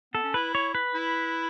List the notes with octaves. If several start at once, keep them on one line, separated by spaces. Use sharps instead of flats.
B3 A4
C#4
E4 B4
C#5
B4
E4